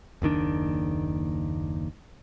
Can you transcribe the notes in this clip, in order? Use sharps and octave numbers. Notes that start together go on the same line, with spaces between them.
F#1 D#2 D#3 D4